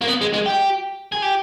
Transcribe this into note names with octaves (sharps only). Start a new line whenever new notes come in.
A#3
B3
G#3
G#3
G4
G#4
G4